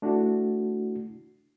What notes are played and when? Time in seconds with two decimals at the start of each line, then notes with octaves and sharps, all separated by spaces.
0.02 A3 D4 E4 F#4